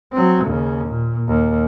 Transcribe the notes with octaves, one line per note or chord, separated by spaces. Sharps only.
F#3 C4
D#2 C#3
A#2
D#2